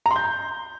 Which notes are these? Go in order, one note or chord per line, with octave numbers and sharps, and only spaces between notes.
A#5
C6
G6